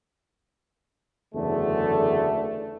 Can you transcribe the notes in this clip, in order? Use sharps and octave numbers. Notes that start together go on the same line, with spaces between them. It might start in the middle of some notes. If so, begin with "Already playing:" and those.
F#1 E2 D3 A3